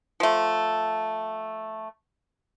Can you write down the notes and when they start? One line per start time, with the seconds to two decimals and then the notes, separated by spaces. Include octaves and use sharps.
0.20 F3 A3